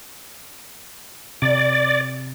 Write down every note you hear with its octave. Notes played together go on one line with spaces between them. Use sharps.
C3 D5